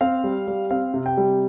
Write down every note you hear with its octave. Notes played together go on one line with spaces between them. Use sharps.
C4 F5
G3
G3
C4 F5
C3
G5
G3